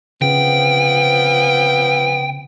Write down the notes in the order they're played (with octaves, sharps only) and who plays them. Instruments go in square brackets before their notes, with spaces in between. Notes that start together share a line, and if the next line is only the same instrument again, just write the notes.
[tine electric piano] C#3 [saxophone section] F3 B3 C4 [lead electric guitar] G5